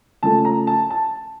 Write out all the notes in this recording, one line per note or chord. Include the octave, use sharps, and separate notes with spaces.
C#3 F3 A3 A5
A#5
A5
A5